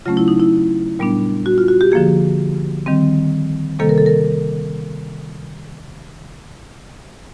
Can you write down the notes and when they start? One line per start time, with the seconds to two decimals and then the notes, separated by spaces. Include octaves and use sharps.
0.06 C#3 F#3 A3 C#4 F4
0.17 E4
0.28 D#4
0.40 E4
0.99 A#2 G3 B3 D4
1.46 F#4
1.58 F4
1.68 F#4
1.81 G4
1.92 D3 F3 A#3 G#4
2.86 D#3 G3 C4
3.79 C3 D#3 G3 A#3 A4
3.89 A#4
3.98 A4
4.06 A#4